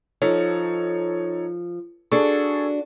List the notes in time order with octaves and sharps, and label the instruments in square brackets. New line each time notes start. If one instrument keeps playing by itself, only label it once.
[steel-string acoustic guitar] F3 [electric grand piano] D#4 A4 C#5
[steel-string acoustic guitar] D4 F#4 [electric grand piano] G#4 A4 C#6